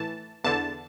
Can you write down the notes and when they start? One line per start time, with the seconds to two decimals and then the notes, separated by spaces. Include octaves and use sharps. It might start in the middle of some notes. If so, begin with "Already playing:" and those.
Already playing: A2 E3 A5
0.44 E2 D3 A5